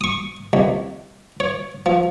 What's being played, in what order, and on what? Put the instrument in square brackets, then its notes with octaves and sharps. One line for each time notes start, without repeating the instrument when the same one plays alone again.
[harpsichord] C#6 D#6
C2
C#5
F3